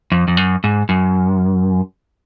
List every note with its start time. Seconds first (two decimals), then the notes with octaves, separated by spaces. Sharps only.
0.12 F2
0.28 F2
0.37 F#2
0.64 G#2
0.89 F#2